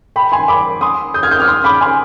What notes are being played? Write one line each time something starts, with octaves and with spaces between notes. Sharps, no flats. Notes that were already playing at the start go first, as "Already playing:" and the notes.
G5 B5
G#5 C6
B5 D6
C6 D#6
D#6 G6
F6 G#6
D#6 G6
D6 F6
C6 D#6
B5 D6
G#5 C6